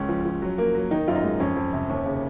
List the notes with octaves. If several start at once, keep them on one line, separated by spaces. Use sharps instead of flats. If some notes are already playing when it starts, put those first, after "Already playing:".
Already playing: C#2 C#4
F3
F3
F#3
A#3
F#3
D#3 D#4
F#2 F4
D#4
G#3
F2 C#4
F2
C3
D#2
C#3